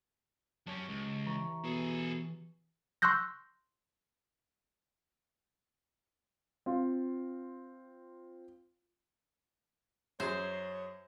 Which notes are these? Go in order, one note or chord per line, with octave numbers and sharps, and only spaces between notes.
F#2 C#4 G4 C#5 A5
C#2
E3 A#5 C#6
B2 G#4 A4
C6 C#6 E6 F#6 G6 A#6
C4 F4
F#2 F#3 G#4 C5 C#5